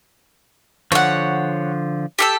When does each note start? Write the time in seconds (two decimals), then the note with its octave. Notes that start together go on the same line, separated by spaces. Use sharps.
0.92 D3 F3 C#5 F#5
2.19 G4 A4 E6